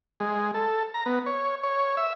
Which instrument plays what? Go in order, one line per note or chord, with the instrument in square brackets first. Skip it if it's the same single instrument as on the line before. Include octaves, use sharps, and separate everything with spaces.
[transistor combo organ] G#3
A4
A#5
B3
C#5
C#5
E5